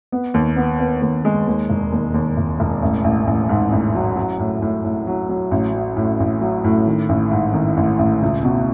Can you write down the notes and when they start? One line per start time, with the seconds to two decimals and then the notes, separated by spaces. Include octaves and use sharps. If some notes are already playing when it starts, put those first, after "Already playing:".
0.12 B3
0.34 D#2
0.56 B3
0.79 B3
1.02 D#2
1.25 G#3
1.47 D#2
1.70 E1
1.92 D#2
2.14 D#2
2.37 E1
2.60 E1
2.82 A1
3.04 A1
3.27 A1
3.49 G#2
3.72 A1
3.95 F#3
4.16 F#3
4.39 A2
4.62 A2
4.84 A2
5.07 F#3
5.29 F#3
5.51 A1
5.74 F#3
5.96 A2
6.20 A1
6.41 F#3
6.64 A2
6.86 D#3
7.09 A1
7.31 G#2
7.54 D#3
7.77 A1
7.99 A1
8.22 C#2
8.44 B2